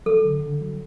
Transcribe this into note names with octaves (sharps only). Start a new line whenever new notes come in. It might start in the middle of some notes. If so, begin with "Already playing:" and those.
F#3 A4
D3
D3
F#3